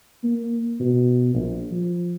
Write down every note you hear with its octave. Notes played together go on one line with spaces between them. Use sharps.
A#3
B2
A#1
F3